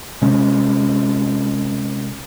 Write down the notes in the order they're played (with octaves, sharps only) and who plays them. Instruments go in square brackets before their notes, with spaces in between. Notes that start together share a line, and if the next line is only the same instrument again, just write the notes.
[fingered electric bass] C3 G#3 C#4